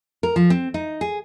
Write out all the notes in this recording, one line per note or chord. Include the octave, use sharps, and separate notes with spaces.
A#4
F3
C4
D#4
G#4